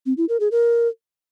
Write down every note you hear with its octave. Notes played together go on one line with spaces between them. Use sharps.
C4
E4
A#4
G#4
A#4